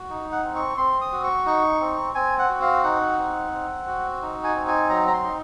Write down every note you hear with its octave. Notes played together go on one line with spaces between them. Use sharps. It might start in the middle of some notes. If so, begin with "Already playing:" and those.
Already playing: F#4
D#4
F#5
C4
C#6
C4 C6
D#6
F#4
C#6
D#4 C#6
C4
C4 G#5
F#5
F#4
F5
D#4 F#5
C4
C4
F#4
D#4
G#5
C4
G#5
F#3 A#5
A#5
C6
D#4